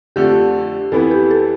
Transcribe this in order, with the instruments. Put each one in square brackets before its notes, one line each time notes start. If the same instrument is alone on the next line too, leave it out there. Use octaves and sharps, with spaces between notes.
[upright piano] F2 D3 F3 A3 D4 [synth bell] G4
[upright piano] F2 E3 B3 E4 [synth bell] A4
[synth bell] G4
A4